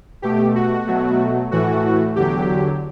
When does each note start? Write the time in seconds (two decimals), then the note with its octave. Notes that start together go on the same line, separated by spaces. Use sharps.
0.22 B2 A3 G4
0.55 F#4
0.86 B2 F#3 A3
1.51 A2 E3 A3 F#4
2.16 E2 D3 F#3 G4